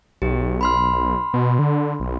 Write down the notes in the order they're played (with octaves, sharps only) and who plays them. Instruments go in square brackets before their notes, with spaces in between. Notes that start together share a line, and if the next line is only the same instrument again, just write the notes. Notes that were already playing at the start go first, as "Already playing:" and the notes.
[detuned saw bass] B1 [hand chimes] G4
[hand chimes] B5 C6 F6
[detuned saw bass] B2
D3
B1